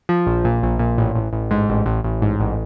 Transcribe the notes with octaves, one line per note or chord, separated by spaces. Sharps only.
F3
A#1
A#2
A#1
A#2
A1
A1
A1
G#2
A1
A1
A1
G#2
A1